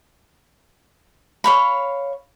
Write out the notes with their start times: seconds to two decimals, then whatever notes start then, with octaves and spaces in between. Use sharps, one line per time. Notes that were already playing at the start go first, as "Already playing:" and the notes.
1.44 C#5 F5 B5